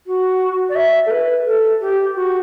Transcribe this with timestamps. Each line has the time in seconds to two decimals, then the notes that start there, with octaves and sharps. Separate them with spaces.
0.06 F#4
0.69 D5
0.75 E5
1.06 A4
1.11 B4
1.46 A4
1.81 G4
2.15 F#4